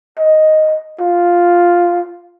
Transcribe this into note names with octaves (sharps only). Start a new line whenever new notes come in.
D#5
F4